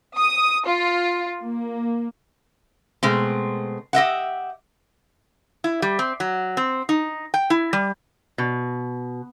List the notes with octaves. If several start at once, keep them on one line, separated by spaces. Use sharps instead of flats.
D#6
F4
A#3
B2 G#3 A3 C4
G4 D#5 E5 F#5
E4
G3
C4
F#3
C4
D#4
G5
E4
G3
B2